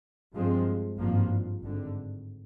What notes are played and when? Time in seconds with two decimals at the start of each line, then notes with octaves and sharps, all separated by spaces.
0.33 G2 F3 G#3 C4
0.97 G#1 G2 F3 A#3
1.62 G#1 G2 D3